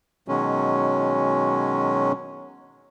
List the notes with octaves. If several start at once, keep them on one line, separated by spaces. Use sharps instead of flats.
B2 D#3 F#3 G#3 C#4